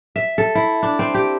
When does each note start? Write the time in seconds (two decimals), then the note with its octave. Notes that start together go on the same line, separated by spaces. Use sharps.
0.16 E5
0.38 A4
0.55 E4
0.83 D4
0.99 C4
1.14 G4